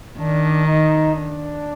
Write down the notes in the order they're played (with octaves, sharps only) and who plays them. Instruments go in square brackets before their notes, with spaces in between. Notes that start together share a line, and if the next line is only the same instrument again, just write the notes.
[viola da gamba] D#3 [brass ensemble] D4
[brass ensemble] D#4
D4